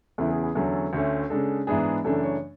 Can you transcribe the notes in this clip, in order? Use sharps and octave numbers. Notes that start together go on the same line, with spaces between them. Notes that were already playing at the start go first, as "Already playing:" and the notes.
E2 C#3 E3 B3 E4 A4
G#4
G#4
E2 D3 F#3 C#4 A4
D2 D3 A3 C#4
C#3 G#3 D4 A4
G#2 E3 B3 D4 G#4
F#2 C#3 E3 A3 D4 A4
C#5